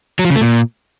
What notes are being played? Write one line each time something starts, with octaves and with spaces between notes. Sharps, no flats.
F#3
F3
C#3
A3
A#2